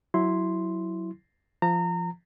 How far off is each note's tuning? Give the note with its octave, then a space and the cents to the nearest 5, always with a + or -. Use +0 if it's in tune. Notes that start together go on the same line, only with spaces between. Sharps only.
F#3 +0 E4 +0 C6 +0
F3 -15 A#5 -30